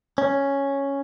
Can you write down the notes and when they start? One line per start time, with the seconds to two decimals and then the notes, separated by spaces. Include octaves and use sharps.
0.18 C#4